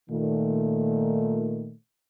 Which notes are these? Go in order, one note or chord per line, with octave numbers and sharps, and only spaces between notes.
A#2 D#3 A3